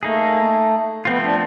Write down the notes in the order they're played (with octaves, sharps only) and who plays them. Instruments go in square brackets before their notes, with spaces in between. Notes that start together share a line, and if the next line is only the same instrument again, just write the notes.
[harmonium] A3 [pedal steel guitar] A#3 D#4 G#4
[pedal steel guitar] F3 A3 C4 F4 [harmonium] B3
[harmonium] D4